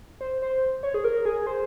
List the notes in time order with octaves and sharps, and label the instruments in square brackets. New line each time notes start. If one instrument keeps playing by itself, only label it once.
[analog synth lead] C5
C5
C#5
G#4
A#4
G#4
C5